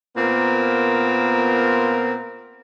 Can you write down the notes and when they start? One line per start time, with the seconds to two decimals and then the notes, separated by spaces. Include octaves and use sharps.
0.16 A#2 B3 C4 F4 A#4